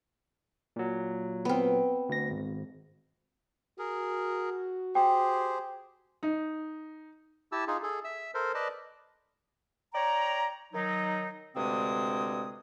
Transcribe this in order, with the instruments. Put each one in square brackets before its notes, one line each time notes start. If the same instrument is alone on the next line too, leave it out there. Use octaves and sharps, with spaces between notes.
[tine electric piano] A#2 F#3
[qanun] B3 C4
[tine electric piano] D2 A#6
G#1
[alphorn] F#4 [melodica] G#4 A#4
[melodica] G4 G#4 C5 [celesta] G5
[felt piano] D#4
[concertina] E4 G4 A5 E6
D#4 F4 G#4
G#4 A4
E5 E6
A4 A#4 C5
B4 D5 D#5 A5
[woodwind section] C#5 D5 G5 A#5
D#3 F#3 D#4
D2 G2 C3 G#3 C4 D#6